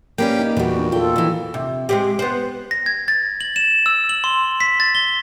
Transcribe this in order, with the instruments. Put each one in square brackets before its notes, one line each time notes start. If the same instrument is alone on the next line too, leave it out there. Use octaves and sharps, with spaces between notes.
[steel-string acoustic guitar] A#3 B4 D5 [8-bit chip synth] C#4 G4 G5
[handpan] D#4
[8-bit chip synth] E2 [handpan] A#2 F#4 [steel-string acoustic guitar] E3 G3
[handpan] A#3 D4
[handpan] F4 A4 [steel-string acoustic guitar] G5
[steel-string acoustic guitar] D#3 E3
[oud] C3
G#3 C4 G4
B3 C5
[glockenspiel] A#6
G#6
A6
F#7
E7
E6
F#7
C6
B6
A6
G7